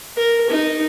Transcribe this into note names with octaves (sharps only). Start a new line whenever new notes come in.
A#4
D#4